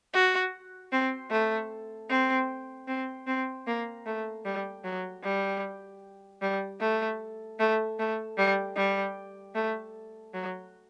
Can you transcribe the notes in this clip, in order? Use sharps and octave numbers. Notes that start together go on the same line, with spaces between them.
F#4
C4
A3
C4
C4
C4
A#3
A3
G3
F#3
G3
G3
A3
A3
A3
G3
G3
A3
F#3